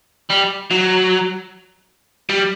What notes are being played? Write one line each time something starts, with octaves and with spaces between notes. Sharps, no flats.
G3
F#3
G3